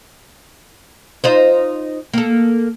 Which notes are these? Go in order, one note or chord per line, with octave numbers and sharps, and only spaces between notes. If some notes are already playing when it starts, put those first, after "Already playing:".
D#4 F4 C5
A#3 A4